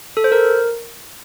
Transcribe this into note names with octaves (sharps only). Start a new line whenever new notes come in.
A4
C5
A#4